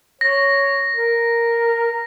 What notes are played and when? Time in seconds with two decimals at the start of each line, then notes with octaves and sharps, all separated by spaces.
0.21 C#5 A#6
0.96 A#4